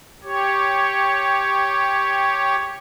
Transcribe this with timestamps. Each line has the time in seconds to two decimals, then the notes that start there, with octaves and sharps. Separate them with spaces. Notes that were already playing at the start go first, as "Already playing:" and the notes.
0.23 G4 C#5